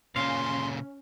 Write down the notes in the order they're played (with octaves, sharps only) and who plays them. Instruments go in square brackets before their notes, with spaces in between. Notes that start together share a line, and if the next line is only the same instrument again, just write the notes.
[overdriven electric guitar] A#2 C#3 [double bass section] C#4 [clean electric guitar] F5 [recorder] C6